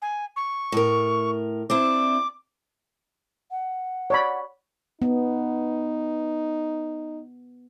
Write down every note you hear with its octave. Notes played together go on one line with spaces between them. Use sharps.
G#5
C#6
A2 A#4
C4 D4 E4 D6
F#5
C#5 D5 B5
B3 D#4